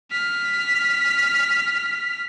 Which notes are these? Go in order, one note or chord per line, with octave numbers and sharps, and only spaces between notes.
F6 B6